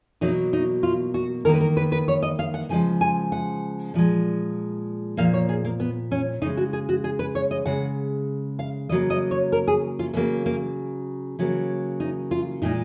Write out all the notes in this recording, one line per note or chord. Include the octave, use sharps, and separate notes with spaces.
B2 F#3 A#3 D#4
D#4
F4
F#4
D#3 A#3 A#4
B4
A#4
B4
B4
C#5
D#5
F5
F#5
C#3 F3 G#3 G#5
G#5
F#5
A#2 F3 G#3
A#2 F3 A#3 F5
C#5
G#4
A#3
B3
C#4
C#3 G#3 D#4
F#4
G#4
F#4
G#4
B4
C#5
D#5
C#3 G#3 F#5
F5
C#3 F#3 A#3 D#5
D#5
C#5
A#4
G#4
F4
C#3 F#3 A#3 B3
A#3
C#3 F#3 A#3
D#4
F4
A#2 G#3 D#4